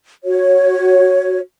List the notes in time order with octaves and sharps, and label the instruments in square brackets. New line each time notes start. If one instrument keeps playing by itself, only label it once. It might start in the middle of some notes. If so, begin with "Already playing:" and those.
[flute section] F#4 C#5